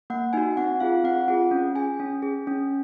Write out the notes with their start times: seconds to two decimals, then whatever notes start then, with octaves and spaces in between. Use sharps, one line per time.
0.10 A#3 F#5
0.33 D#4 F#4 G#5
0.57 C4 F#5
0.80 F4 G#4 F5
1.04 C4 F#5
1.28 F4 G#4 F#5
1.51 C#4
1.76 G#4 G#5
2.00 C#4
2.22 G#4
2.47 C#4